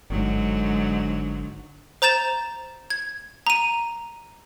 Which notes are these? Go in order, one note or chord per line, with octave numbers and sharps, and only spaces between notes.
G1 G#2 D3 F#3
C5 A#5 G6 A6 E7
G#6
A#5 D#7